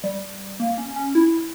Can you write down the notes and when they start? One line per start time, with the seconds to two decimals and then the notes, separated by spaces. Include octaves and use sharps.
0.04 G3
0.60 A#3
0.78 C#4
0.96 C#4
1.15 E4